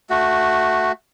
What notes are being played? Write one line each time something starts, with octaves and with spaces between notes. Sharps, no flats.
A3 F#4